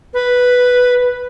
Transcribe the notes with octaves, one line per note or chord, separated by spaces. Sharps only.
B4